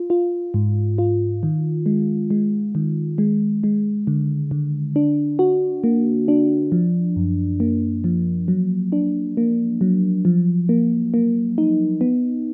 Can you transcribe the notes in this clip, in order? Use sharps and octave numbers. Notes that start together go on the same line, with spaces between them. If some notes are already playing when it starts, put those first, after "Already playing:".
Already playing: F4
F4
G#2
F4
D#3
G#3
G#3
D#3
G#3
G#3
D3
D3
D4
F#4
A#3
D4
F3
F#2
A#3
F3
F#3
D4
A#3
F#3
F3
A#3
A#3
D#4
B3